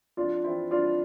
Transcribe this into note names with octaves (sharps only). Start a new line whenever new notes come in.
F2 D4 F4
E3 C4 E4
G3 D4 F4